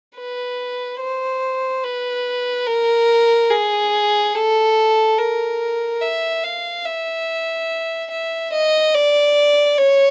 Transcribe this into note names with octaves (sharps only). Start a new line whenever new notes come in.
B4
C5
B4
A#4
G#4
A4
A#4
E5
F5
E5
E5
D#5
D5
C#5